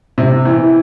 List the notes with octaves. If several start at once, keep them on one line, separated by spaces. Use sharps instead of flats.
C3
E3